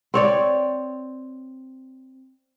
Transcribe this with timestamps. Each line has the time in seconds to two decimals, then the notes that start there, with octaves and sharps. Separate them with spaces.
0.14 C4 C#5 D5